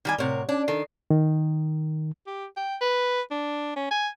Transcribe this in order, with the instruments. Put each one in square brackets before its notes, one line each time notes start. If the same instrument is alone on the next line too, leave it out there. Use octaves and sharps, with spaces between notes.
[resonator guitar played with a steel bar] D#3 G3 G#5
[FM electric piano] A2 C#5 F#5 [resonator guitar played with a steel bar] C3 A#4
[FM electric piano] C#4 D5 [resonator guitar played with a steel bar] D4
[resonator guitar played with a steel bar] D#3 [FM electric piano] D4 A4 C7
[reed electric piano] D#3
[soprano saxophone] G4
G5
B4
D4
C#4
G#5